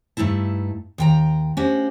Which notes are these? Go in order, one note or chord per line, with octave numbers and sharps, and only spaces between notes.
G2 A3 D#4 E4 A5
D#2 G5 A#5
A3 C#4 D4 F#4 G4 C5